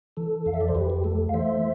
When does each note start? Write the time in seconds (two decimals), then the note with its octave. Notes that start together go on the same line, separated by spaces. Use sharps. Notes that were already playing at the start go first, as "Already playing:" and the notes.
0.17 E3 A4
0.46 F2 F5
0.54 E5
0.61 D5
0.68 C5
0.75 F2 G4 B4
0.90 G4
1.04 A3 A4
1.29 F5
1.34 E3 C5 E5